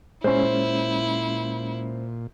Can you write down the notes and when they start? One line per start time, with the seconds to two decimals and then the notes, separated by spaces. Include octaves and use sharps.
0.24 A#2 G#3 C#4 E4 C5